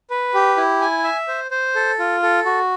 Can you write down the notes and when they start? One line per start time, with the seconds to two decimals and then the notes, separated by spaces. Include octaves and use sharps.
0.10 B4
0.34 G4
0.57 E4
0.81 G#5
1.04 E5
1.28 C5
1.51 C5
1.76 A4
1.99 F4
2.23 A4
2.45 F#4